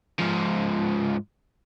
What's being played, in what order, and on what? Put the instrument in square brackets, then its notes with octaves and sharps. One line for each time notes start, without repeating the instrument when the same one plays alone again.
[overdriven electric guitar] G#2 F3